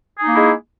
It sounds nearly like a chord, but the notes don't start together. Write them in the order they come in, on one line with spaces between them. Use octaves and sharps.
G#4 D#4 A#3 E4 G#3